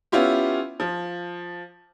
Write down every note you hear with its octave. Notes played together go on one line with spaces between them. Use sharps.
B3 C#4 E4 F4 G4
F3